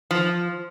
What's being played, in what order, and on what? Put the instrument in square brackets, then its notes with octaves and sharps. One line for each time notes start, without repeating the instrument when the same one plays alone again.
[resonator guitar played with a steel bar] F3